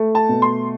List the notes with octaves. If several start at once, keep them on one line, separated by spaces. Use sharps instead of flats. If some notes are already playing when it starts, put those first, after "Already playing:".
Already playing: A3
A5
B2
C6